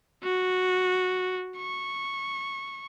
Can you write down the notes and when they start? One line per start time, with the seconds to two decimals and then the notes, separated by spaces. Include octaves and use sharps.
0.23 F#4
1.58 C#6